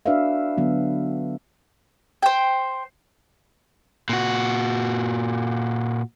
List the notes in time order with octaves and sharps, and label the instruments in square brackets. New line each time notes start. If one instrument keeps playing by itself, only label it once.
[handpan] D4 F#4 B4 D5 E5 F5
D3 F#3 B3
[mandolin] C5 G5
[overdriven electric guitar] A#2 F#4